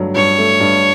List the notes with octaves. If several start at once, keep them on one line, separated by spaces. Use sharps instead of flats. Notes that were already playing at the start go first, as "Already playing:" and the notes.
Already playing: G2 F#3 A3
G2 C#5
A3
G2